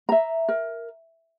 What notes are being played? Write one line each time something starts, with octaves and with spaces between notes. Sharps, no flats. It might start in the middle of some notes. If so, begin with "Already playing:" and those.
E5 A#5
A#4